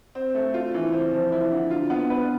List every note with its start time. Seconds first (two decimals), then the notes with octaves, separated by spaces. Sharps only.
0.15 C4
0.35 A3
0.54 F4
0.74 E3
0.93 C4
1.12 F3
1.32 E4
1.51 D3
1.70 F4
1.90 B3
2.10 B4